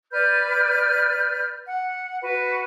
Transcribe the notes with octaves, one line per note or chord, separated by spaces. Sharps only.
B4 D5 F6 G6
F#5
F#4 B4